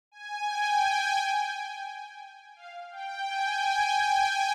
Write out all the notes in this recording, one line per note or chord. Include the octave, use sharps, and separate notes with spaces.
G#5
G5
F5
G5
G#5
G5